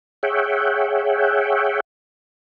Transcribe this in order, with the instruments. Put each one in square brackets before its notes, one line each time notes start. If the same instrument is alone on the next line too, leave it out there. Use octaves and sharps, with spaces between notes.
[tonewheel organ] G#4 C#5 E5 F#5 G5